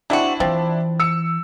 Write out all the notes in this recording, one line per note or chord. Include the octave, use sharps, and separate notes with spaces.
G#3 C4 D4 E4 F#4
E3 F3 C4
E6 C#7